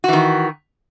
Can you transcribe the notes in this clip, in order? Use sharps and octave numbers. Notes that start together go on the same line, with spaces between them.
D#3 E3 F#4